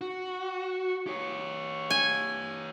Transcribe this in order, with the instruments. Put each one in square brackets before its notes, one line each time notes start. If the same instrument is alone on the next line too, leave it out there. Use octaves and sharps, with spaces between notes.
[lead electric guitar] F#4
G4 C#5
[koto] G#5